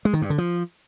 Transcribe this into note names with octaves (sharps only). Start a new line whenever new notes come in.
G#3
D#3
G2
D3
F3